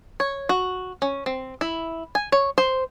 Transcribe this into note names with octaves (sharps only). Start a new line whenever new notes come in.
C#5
F#4
C#4
C4
E4
G#5
C#5
C5